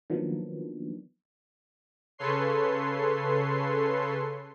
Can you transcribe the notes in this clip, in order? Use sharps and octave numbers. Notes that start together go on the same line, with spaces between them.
D#3 F3 F#3 A#3 B3 D4
C#3 A4 B4 C#5 C6 C7